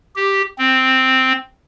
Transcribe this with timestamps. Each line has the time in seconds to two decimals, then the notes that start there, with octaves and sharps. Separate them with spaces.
0.16 G4
0.58 C4